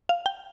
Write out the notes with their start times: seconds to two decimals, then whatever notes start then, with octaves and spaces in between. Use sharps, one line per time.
0.09 F5
0.26 G5